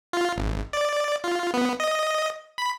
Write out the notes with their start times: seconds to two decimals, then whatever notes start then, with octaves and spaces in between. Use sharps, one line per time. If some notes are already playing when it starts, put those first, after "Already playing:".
0.13 F4
0.36 G#1
0.73 D5
1.24 F4
1.54 B3
1.80 D#5
2.58 B5